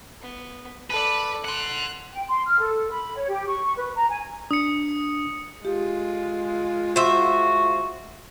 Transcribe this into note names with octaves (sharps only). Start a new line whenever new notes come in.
B3
A4 B4 D5
F#5 C6 F#6
G5
C6
F6
A4
B5
C#5
G4
C#6
B4
A#5
G#5
D4 D#6 C#7
G#3 F4 G4
F#4 C5 E5